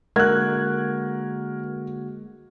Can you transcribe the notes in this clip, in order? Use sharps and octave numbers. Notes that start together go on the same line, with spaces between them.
D3 G#3 A#3 F#4 A#4 F#6 G#6